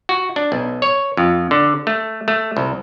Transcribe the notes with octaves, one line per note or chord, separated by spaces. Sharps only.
F#4
D4
B1
C#5
F2
D3
A3
A3
C2